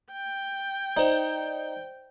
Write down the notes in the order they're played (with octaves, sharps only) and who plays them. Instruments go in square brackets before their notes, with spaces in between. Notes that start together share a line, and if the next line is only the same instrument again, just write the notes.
[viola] G5
[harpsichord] D#4 [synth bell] C5 D5